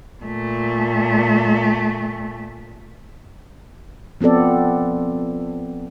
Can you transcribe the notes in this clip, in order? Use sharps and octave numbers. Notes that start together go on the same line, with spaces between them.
A#2 A3
F3 B3 C4 A4 D5